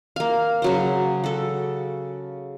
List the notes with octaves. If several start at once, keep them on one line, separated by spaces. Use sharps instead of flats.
A#3 F5
C#3 F#3 C5
F#4 A4